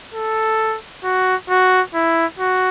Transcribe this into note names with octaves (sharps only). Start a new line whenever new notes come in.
A4
F#4
F#4
E4
F#4